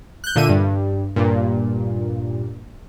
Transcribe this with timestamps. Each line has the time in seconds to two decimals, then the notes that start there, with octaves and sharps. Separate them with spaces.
0.24 F#6 G6
0.36 A#2 D3 E5 D#7
0.49 G2
1.16 G2 A#2